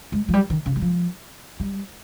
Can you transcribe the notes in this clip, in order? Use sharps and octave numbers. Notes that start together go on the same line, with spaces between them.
G#3
F3
G3
D#3
C#3
G3
F3
G3